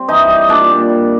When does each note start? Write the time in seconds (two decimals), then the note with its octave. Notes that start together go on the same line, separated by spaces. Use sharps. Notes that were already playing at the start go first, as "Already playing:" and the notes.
Already playing: G3 C4
0.08 E3 D#4 D#5
0.28 G3
0.48 A#2 D4 D5
0.70 A#2
0.89 G3